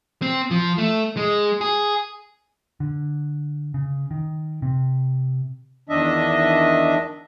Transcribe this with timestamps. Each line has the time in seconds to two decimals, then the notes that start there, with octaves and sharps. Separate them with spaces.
0.22 C4
0.51 F3
0.78 A3
1.17 G#3
1.61 G#4
2.80 D3
3.74 C#3
4.11 D#3
4.62 C3
5.89 E2 D#3 D4 D#5 E5